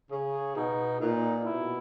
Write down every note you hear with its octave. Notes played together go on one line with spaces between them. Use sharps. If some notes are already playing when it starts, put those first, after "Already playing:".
C#3 G#4
B2 D#4
A#2 D#4
B2 E4